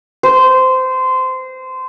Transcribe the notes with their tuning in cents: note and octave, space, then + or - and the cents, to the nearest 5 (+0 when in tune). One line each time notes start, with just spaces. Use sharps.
C5 -20